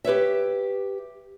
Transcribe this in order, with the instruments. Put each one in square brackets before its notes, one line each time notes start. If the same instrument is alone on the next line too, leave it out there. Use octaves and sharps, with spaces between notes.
[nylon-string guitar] G4 B4 C#5 E5